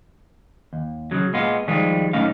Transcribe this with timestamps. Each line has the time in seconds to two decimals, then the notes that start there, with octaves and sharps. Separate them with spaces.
0.73 D#2
1.11 C#3 F#3
1.33 A#2 G#3 B3 F4
1.68 D#3 F3 G3 G#3 F4
2.13 B1 A3 C#4 D#4 F5